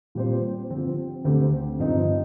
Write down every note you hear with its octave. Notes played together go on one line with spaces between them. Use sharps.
A#2 G3 C4 G4 C5
D3 F3 C4
D2 D3 A3 C4 G4
G2 F3 C4 D#4